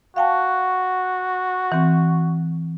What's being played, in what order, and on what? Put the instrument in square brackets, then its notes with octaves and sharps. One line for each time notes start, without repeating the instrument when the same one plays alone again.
[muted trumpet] F#4 [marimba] F5 G5 A5
[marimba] E3 C4